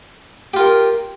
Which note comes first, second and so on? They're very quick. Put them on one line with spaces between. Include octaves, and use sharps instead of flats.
G4 F4 A#4